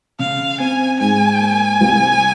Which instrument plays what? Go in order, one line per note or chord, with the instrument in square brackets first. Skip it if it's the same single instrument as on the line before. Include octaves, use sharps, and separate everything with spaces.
[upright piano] C#3 [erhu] F5
[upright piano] C4 [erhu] G#5
[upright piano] G#2 [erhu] G#5
[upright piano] A#3
C2